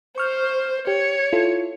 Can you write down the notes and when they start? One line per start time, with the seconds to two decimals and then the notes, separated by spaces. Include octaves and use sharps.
0.18 C5 C#6 F6 G6
0.87 G4 C#5
1.33 E4 F4 A4